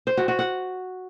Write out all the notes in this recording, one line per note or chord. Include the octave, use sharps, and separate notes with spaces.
C5
F#4
F#4
F#5